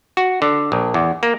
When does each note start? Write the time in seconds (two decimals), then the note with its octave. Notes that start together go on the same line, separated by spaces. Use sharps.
0.17 F#4
0.42 D3
0.72 A#1
0.94 E2
1.23 A#3